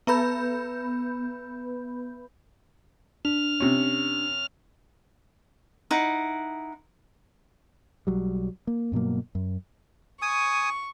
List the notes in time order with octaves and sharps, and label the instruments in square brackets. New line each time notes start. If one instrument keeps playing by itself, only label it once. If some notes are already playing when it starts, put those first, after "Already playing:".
[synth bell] B3 B4 B5 G6
[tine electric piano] D4 [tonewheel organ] F6
[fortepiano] C3 C#4
[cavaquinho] D#4 E4 F#5
[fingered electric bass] B1 F#3 G3
A#3
G2 B2 F#3 A#3
F#2
[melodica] G#5 D#6 [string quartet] C#6